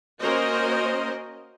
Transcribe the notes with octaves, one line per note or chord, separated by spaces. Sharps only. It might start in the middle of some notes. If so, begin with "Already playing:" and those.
A#3 C#4 F#4 A#4 C5 D#5